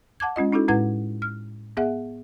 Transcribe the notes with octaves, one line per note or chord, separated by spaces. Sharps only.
F#5 A5 D6 G#6
G#3 C#4 F4 D#5
C#4 D#4 E4 F#4 A4
A2 G#3 E4 B4 F#5 G#6
F6
B3 G#4 E5 F#5